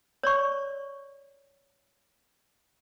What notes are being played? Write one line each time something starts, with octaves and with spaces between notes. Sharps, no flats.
C#5 D5 C#6